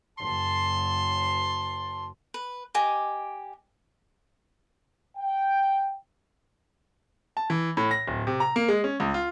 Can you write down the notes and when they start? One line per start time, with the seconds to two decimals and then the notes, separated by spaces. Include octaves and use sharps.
0.19 F#1 F#2 A5 C6
2.34 B4
2.75 G4 D#5 G#5 D6
5.17 G5
7.37 A5
7.50 E3
7.77 A2
7.91 A#6
8.08 D1
8.27 C3
8.40 A#5
8.56 A#3
8.68 G#3
8.84 C#4
9.00 C#2
9.14 F4